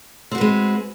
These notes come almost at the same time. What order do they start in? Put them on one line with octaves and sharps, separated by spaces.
C4 F#4 B4 G#3